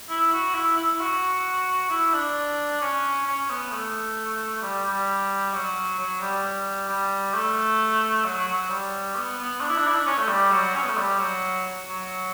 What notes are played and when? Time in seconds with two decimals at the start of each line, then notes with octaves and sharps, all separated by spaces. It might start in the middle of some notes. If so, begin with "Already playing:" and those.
0.09 E4
0.32 F#4
0.54 E4
0.77 E4
1.00 F#4
1.90 E4
2.13 D4
2.81 C#4
3.26 C#4
3.49 B3
3.72 A3
4.62 G3
4.85 G3
5.53 F#3
5.98 F#3
6.21 G3
6.44 G3
6.89 G3
7.34 A3
8.24 F#3
8.47 F#3
8.70 G3
9.15 B3
9.38 B3
9.60 D4
9.69 E4
9.77 D4
9.86 E4
9.95 D4
10.06 C#4
10.18 A3
10.28 G3
10.51 F#3
10.75 C#4
10.82 B3
10.89 A3
10.97 G3
11.19 F#3
11.87 F#3